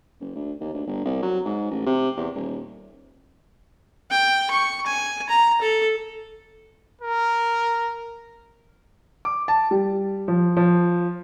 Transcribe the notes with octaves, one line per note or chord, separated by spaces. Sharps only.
F#1
D2
D#2
D2
G1
C2
F#3
G#2
A1
C3
E2
D#1
G5
C#6
G#5
A#5
A4
A#4
D6
A5
G3
F3
F3